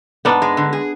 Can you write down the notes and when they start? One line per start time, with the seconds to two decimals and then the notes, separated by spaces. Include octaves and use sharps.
0.25 G#2 B3 D4
0.42 G#3
0.57 D3
0.73 G#4